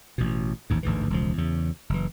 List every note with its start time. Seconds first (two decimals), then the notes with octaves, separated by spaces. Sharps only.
0.18 A1 B2
0.70 A1 D#2 G#2
0.83 A1 D2 G#2 E3
1.10 E1 C#2 F3
1.38 E2 C#3
1.89 F#1 E3